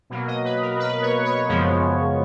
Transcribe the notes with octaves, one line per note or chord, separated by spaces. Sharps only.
B2 F#3 A#3
D#5
B4
A#4
B4
C#5
C#5
F#2 C#3 F3 G#3 B3